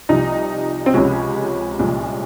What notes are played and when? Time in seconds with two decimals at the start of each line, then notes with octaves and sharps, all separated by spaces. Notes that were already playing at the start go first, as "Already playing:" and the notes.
0.09 C2 C3 F3 D#4
0.86 C4
0.94 C#2 C3 F3 G#3 C#4
1.79 C2 A#2 F3 G#3